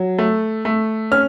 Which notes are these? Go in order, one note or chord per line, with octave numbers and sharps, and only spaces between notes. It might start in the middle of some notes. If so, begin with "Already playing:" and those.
Already playing: F#3
A3
A3
C#4 F6